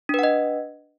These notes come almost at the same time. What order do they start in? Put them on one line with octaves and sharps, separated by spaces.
D4 B4 F#5 D#5